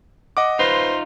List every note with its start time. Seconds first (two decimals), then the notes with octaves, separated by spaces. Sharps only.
0.37 D#5 F#5 D6
0.59 D#4 F4 B4 C5